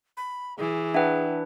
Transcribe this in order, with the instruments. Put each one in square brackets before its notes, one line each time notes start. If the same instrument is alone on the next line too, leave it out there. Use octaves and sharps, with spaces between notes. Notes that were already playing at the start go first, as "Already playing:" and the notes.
[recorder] B5
[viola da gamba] E3 [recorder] G#4
[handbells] D4 B4 [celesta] E5 F#5 G5